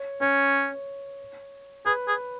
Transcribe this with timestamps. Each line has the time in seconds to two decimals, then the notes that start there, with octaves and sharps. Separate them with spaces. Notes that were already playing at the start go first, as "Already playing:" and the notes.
Already playing: C#5
0.21 C#4 C#5
1.86 G#4 B4
2.08 G#4